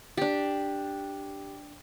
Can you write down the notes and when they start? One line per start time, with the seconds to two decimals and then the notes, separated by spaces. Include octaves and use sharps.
0.17 D4 G4